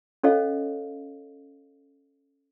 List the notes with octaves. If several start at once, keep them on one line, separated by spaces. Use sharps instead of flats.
C#4 A4 C#5 D#5 F5